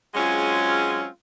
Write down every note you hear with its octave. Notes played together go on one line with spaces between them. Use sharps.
F#3 G#3 C4 C#4 F4 G#4